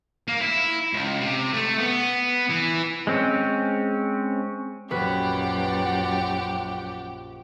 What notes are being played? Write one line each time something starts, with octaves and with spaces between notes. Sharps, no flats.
A#3
E4
C#2
C3
A3
B3
E3
G#3 C4 C#4
A#1 F#2 F#4 G4 B4 F#5